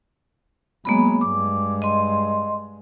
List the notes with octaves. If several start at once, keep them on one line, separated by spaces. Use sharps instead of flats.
F#3 G#3 A#3 B3 B5
G2 G#3 D6
D#5 C6